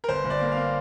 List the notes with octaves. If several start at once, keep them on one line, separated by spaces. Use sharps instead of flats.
A#4
G1 C5
G1
D5
A#3
F5
A#3